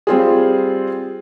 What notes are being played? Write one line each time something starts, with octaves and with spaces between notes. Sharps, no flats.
G3 C4 F4 G#4